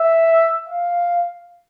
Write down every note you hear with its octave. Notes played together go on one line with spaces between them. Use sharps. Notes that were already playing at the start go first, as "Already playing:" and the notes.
Already playing: E5
F5